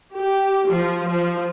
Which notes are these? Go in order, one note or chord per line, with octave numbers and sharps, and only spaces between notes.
G4
F3
F3